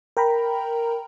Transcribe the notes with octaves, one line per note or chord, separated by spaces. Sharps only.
A#4 G5 A#5 B5